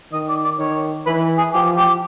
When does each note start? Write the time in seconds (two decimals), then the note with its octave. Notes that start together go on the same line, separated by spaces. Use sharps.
0.12 D#3 D#5
0.29 D5
0.44 D5
0.59 D#3 C#5
1.06 E3 B4
1.38 G#4
1.54 F3 G4
1.77 G4